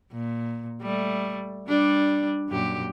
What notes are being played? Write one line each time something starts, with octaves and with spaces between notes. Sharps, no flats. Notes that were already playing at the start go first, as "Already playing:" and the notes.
A#2
G3 A3
G3 D4
F#2 A#2 G4